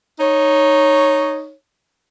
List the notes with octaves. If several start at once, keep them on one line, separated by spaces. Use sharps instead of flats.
D#4 C#5